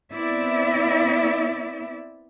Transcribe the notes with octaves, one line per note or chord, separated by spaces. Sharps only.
B3 C4 E4 D5 E5